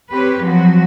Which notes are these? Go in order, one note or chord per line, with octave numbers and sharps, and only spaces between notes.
C4 G4 B4 C#5
F3 F#3 C4 F#4